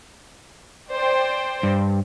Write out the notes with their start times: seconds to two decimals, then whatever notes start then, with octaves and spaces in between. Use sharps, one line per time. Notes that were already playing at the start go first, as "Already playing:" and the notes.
0.92 C5 D5 G5
1.63 G2